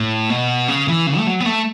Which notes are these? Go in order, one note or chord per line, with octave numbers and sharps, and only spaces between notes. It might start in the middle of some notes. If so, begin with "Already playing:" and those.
Already playing: A2
B2
C#3
E3
C#3
A3
F#3
B3
A3